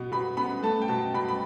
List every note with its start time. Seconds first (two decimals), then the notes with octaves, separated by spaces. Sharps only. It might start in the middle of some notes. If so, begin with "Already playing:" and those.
Already playing: B2 B3
0.12 B2 B5
0.37 B3 B5
0.63 A3 A5
0.82 G5
0.88 B2 A5
1.14 B2 B5
1.28 B5